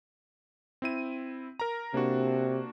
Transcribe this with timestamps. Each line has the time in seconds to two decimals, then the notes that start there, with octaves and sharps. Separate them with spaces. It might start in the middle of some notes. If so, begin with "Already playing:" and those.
0.82 C4 E4 D#7
1.60 A#4 A#5
1.94 C3 A#3 D4 F#4